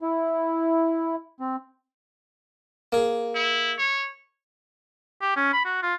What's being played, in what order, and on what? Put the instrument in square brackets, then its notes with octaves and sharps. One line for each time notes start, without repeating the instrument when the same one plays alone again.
[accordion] E4
C4
[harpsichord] A#3 G#4
[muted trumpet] E4
C#5
[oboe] G4
C#4
B5
F#4
F4